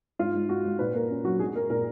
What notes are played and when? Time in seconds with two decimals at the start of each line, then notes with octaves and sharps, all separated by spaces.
0.19 G#2 F4
0.34 G#2
0.49 G#2 F#4
0.65 G#2
0.79 A#2 B4
0.94 A#3 A#4
1.10 C#4
1.25 F#3 F#4
1.39 G#3 G#4
1.55 G#3 A#4
1.70 A#2 A#4